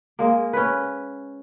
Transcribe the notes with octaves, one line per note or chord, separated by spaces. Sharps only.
G#3 A#3
C#4 B4